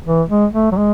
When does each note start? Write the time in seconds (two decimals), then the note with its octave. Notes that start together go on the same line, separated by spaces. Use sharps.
0.06 E3
0.29 G#3
0.53 A3
0.72 F#3
0.77 G#3